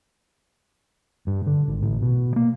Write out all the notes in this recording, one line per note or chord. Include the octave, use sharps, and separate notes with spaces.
G2
D3
G#1
A1
B2
A#3